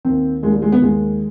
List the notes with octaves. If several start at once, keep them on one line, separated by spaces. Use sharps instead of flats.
D#2 D#3 C4
D#2 D#3 G#3
G3
G#3
B3
D#2 D#3 G#3